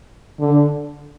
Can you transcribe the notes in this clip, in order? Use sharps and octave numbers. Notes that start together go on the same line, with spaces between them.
D3